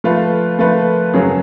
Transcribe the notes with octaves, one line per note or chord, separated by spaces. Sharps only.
F3 A3 F4 B4
F3 A3 F4 B4
F#2 C#3 F#3 C#4 G#4